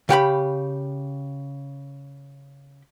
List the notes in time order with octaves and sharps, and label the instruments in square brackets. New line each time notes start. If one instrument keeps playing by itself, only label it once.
[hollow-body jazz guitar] C#3 G4 F#5 B5